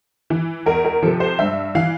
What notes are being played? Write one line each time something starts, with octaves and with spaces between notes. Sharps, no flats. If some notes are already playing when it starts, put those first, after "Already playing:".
E3
E2 A#4
A#4
C3 F3 A4
C5
G2 E5
E3 F5